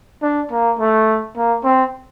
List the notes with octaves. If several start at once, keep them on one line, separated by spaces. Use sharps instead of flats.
D4
A#3
A3
A#3
C4